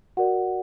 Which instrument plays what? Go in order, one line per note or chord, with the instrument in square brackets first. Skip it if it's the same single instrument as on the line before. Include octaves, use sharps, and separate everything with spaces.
[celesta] F#4 A#4 D5 F#5